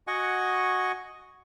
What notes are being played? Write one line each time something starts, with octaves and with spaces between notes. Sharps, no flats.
F#4 D#5 F#5 G#5 C#6